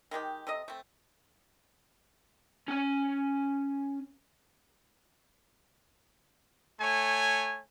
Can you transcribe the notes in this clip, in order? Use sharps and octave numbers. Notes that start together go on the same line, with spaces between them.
D#3 G#3 D#4 G4
C3 A4 D#5
A3 C4
C#4 G#5
A3 C#5 G#5